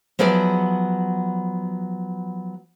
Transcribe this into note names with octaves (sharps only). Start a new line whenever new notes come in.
F3 F#3 B3 G#4 D5 E5